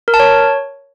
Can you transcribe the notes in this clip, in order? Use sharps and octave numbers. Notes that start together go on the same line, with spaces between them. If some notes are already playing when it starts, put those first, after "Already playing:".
A#4
A5
C#5